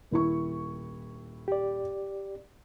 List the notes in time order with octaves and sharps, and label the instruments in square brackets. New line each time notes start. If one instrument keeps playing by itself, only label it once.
[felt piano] D#1 E4 C#6
[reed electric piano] G4 D5